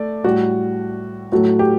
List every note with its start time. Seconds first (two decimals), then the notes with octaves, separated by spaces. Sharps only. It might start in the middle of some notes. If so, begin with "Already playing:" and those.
Already playing: A3 D5
0.24 A2 G3 F#4
1.32 A2 F#3 A3 F#4
1.59 G4